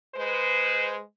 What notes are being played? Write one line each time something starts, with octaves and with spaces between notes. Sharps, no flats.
G#3 B4 C5